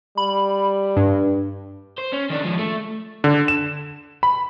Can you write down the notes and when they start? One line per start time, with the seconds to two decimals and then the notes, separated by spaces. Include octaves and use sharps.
0.18 G3 B5
0.97 G2
1.98 C5
2.13 C#4
2.30 D#3 D4
2.44 F3 G#3
2.59 A3
3.24 D3
3.48 E7
4.23 B5